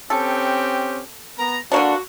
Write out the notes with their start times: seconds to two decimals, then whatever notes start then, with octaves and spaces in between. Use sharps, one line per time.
0.10 C4 C#4 G4 A4
1.38 B3 A#5
1.72 D3 A#3 D4 F#4